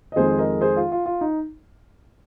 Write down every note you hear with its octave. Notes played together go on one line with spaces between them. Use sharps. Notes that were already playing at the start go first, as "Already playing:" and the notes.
D#5
F2 D#3 G#3 G#4 C5
A#4 D#5
G#4 C5
F4
F4
F4
D#4